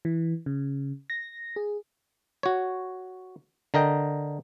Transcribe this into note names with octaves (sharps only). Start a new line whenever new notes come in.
E3
C#3
A#6
G#4
F#4 C#5
D3 A#4 D#5 G5